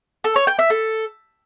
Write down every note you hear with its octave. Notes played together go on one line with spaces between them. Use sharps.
A4
C#5
G5
E5
A4